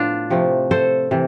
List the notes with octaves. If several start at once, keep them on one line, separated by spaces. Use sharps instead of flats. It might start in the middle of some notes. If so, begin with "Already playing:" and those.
Already playing: A2 B3 D4 F4
C3 F3 A3
A4 C5
C3 E3